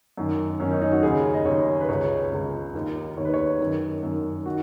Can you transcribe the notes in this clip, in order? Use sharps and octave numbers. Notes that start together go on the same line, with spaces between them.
F#2 D#3
F#2 D#3 C#4
D#4
D#4
F#4
D#2 C#3 G#4
D#5
D#2 C#3 C#5
B4
C#2 C#3 C#5
C#2 C#3
D#2 D#3
D#2 D#3 C#5
B4
C#5
F#2 D#3
F#2 D#3
D#3 F#4